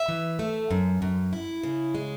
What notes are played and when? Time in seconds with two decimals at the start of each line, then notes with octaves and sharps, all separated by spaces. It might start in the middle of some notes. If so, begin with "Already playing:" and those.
Already playing: E5
0.08 E3
0.39 A3
0.71 F#2
1.02 F#2
1.33 E4
1.63 C#3
1.95 G#3